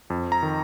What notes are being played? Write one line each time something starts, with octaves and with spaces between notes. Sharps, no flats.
F2
A#5
D#3